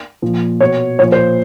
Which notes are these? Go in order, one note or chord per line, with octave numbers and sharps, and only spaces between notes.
A#2 F3
B2 C#5
A#2 F3 C#5
C5